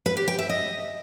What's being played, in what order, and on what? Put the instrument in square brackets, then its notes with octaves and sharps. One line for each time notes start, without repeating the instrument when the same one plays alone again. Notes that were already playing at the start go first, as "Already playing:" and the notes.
[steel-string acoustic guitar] B4
G4
G5
E5
D#5